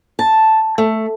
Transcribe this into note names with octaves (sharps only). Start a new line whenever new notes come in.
A5
A3